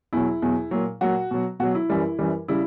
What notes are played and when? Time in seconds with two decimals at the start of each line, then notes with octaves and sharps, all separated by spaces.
0.13 E2 B2 F#3 E4
0.42 E2 B2 F#3
0.71 A#2 F#3
1.01 A#2 F#3 F#4
1.31 B2 F#3
1.60 B2 F#3 F#4
1.75 E4
1.90 F#2 E3 G3
2.19 F#2 E3 G3
2.48 C#3 G3 E4